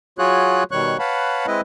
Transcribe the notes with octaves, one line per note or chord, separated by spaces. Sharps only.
F#3 F4 F#4 G#4 C#5 F#6
B2 D#3 G3 C#5 C#6 F#6
B4 C#5 F5 F#5 A5 B5
G#3 C4 E4 B4 D#5